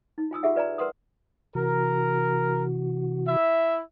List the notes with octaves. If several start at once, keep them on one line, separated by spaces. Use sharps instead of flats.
D#4
F4 G#5 D#6 E6
F4 G4 G#4 E5 F#5
F4 B4 D5 G#5 A#5
A#4 B4 F#5 C6 D#6
C3 E3 F#4 A#4
E4 E5